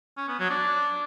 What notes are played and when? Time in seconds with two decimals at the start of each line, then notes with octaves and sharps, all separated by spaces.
0.17 C#4
0.28 B3
0.39 F#3
0.50 D4